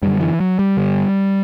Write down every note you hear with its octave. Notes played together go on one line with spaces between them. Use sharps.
F#2 D3 G3
E3
F#3
G3
G2 D3